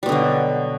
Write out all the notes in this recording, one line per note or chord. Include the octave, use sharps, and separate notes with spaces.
B2 D3 F#3 G3